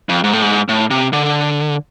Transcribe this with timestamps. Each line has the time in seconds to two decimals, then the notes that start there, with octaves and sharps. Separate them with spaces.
0.09 F2
0.24 G#2
0.33 A2
0.42 G#2
0.69 A2
0.90 C3
1.13 D3